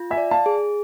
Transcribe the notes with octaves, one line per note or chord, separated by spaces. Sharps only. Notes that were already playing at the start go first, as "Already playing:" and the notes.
Already playing: F4
E5 G#5
D5
F5 A5
G#4